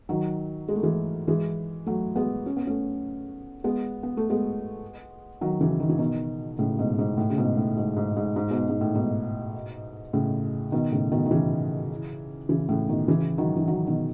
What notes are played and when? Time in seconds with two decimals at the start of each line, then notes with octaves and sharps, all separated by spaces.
0.09 D#3 F#3
0.68 G#3
0.75 A3
0.83 E3 G#3
1.28 E3 G#3
1.86 F#3 A3
2.16 G#3 B3
2.46 C#4
2.57 B3
2.67 A3 C#4
3.64 G#3 B3
4.03 B3
4.17 A3
4.30 G#3 B3
5.41 D#3 F#3
5.61 C#3 E3
5.80 D#3
5.89 E3
5.98 B2 D#3
6.59 A2 C#3
6.79 G#2 B2
6.99 G#2
7.18 A2
7.30 C#3
7.37 G#2 B2
7.57 A2
7.77 G#2
7.97 G#2
8.17 G#2
8.36 G#2
8.51 G#2 B2
8.70 G#2
8.81 A2
8.95 G#2 B2
10.13 A2 C#3
10.72 B2 D#3
10.92 A2 C#3
11.12 B2 D#3
11.25 D#3
11.31 C#3 E3
12.49 C#3 E3
12.69 A2 C#3
12.88 B2 D#3
13.08 C#3 E3
13.38 D#3 F#3
13.57 E3
13.67 D#3 F#3
13.87 B2 D#3